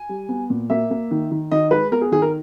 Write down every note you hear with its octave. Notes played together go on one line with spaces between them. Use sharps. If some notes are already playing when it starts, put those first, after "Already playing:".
Already playing: G#5
G3
B3
A#2
A#3 E5
A#3
D#3
D#3
D#3 D#5
G#3 B4
B3 A#4
G#4
D#3 G#4
A#4